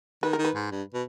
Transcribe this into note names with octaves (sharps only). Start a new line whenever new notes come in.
D#3 B4
A#4
D#3
B4
G#2
G2
B2